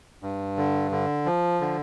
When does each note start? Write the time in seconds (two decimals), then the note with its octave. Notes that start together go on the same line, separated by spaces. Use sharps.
0.23 G2
0.57 D3
0.91 D3
1.26 F3
1.61 D3